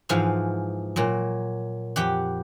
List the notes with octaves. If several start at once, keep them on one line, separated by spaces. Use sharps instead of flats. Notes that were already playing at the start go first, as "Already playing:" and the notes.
G#2 E3 F3 F5 F#5
A#2 F#3
F2 G4 F#5